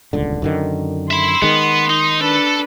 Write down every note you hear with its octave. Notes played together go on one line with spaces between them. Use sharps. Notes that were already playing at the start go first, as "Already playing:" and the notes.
D#1 C#2 D3
F#2 D3 D#3
E5 B5 C6
D#3 G#3 B3
D#4
D4 A4 B4